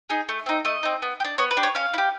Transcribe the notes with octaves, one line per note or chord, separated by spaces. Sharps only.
D#4 G#4
A3
C4 D#4
A3 D#5
C4 D#4
B3
G4
D4
B3 C#5
B4
D4 G4
C#5
C#4 F5
E4
G4